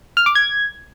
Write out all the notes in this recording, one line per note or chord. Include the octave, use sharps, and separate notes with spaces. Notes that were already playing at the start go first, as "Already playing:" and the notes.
F6
D6
G#6